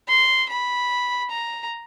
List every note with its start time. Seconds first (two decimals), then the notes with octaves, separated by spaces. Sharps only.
0.08 C6
0.49 B5
1.29 A#5